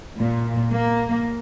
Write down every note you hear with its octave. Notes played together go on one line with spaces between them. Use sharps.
A#2
A#3